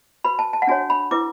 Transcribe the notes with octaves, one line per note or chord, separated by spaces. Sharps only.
F#4 B4 B5
A5
A5
F#5
D4 F#4 C#5 G#5
B5
E4 B4 D6